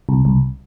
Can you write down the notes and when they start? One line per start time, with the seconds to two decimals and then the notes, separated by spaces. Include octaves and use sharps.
0.09 C2
0.25 C2